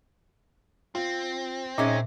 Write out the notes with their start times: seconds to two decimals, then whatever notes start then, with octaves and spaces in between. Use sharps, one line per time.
0.95 C4 F4
1.78 A#2 G#3 C#4 D#4 E5